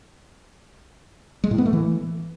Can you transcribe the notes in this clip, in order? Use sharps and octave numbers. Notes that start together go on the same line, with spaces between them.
G#3
A2
B3
A3
E3